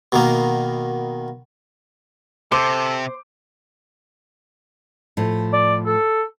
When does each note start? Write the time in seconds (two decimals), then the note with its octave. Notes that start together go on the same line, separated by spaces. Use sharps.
0.12 B2 D#3 A#3
2.52 C3 A4 C5 D6
5.17 A2 F3
5.53 D5
5.86 A4